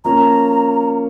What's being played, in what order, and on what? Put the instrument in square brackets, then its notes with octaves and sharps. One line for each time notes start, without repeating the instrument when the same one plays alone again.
[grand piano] F3 A#3 C#4 [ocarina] A#5